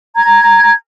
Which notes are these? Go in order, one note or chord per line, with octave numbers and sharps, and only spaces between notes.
A#5 G#6